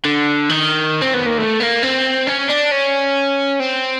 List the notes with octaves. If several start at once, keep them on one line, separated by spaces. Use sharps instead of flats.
D3
D#3
C4
B3
A#3
A3
A#3
C4
C#4
D4
C#4
C4